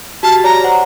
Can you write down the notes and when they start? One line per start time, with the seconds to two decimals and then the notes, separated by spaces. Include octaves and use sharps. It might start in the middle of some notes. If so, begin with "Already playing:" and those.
0.23 F#4 G4 A5 F6
0.44 C#5 D5 A#5
0.64 C5 F#5